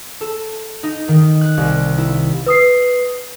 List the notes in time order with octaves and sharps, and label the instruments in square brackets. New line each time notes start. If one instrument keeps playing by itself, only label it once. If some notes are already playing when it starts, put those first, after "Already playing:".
[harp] A4
D#4
D#3
F#6
C2
E4
[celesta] B4 D#6 C7